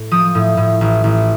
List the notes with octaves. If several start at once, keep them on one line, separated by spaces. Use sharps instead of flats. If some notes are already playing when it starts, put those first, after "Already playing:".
Already playing: A2
F3 D#6
A2
A2
A1
A1